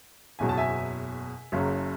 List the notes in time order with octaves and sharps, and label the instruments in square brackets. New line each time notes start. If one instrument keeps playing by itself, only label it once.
[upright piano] F#1 E2 B2 F#3 G#5
A5
E5 G#5
F#1 F#2 C#3 F#3